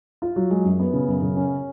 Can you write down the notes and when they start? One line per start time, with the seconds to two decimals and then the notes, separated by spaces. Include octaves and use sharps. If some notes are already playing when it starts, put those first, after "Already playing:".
0.22 F4
0.36 F#3
0.50 G#3
0.65 F#2
0.79 B3
0.93 C#3
1.08 F#2
1.22 C#3
1.36 C#4